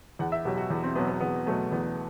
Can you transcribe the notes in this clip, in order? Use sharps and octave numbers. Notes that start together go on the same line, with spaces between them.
E2 F#5
E5
B2 F#3 G4
F#4
E2
C4
B2 F#3 B3
B3
E2 B3
B2 F#3 A3
E2 B3